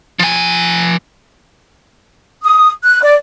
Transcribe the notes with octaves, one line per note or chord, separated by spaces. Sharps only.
F3 G#5
D#6
F#6
D5